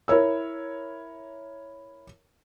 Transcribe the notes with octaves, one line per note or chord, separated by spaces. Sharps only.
E4 A#4 C#5 E6